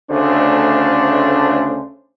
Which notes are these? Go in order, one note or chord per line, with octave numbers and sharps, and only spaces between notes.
D2 C#3 A3 C#4 D4 C5